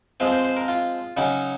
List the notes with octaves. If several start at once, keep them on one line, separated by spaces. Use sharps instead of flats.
F3 G#3 C4 C5
C5
C5
A#4
F4
C#3 F#3 C#4 D#4